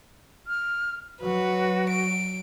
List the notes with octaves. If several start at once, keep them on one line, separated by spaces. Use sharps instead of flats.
F6
F#3 F#4 B4
D7